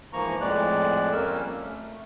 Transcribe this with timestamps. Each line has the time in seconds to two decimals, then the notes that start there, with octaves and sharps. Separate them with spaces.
0.13 G#2 E3 F3 A#3 A#5 C#6
0.41 F2 A2 G#3 D5 F#6
1.12 F2 G3 A#3 C#4 A#4 E6
1.52 A3